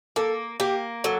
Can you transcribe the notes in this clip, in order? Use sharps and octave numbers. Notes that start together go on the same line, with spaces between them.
A#3 A4
A#3 G4
F#3 A4